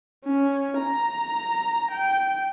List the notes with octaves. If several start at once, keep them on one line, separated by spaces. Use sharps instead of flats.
C#4
A#5
G5